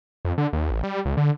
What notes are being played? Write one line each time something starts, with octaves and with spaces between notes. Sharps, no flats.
F2
D3
D#2
A1
G3
C#2
D3